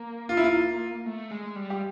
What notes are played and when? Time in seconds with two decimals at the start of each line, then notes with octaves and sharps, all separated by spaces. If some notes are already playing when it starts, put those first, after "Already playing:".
Already playing: A#3
0.29 F4
0.37 E4
0.44 F4
1.06 A3
1.31 G#3
1.56 G3
1.70 G4